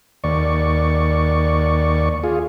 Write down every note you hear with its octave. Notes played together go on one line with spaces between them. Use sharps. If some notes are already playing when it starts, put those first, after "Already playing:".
D#2 D5 C#6
F4 G#4